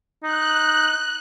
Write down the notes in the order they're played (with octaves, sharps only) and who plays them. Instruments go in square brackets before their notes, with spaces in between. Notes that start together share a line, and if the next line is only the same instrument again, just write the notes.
[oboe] D#4 [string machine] F#6